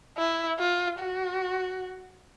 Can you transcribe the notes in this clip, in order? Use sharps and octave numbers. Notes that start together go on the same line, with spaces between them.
E4
F4
F#4